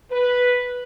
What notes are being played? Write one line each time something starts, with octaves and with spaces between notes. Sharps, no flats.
B4